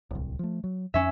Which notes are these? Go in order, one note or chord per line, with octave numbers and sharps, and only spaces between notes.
D1 C2
F3 A3
F#3
F2 C#4 E5